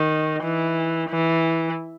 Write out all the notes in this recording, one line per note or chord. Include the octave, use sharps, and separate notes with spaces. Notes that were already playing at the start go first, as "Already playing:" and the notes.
Already playing: D#3
E3
E3